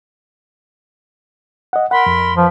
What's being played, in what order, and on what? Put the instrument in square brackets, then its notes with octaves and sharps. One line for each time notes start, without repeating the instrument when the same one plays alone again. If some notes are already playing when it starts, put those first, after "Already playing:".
[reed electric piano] D#5 F#5
[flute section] A#4 B5 C6 [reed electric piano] F#5
[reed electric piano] F2
[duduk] F3 [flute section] B4